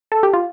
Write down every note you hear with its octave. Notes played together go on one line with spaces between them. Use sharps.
A4
G4
F4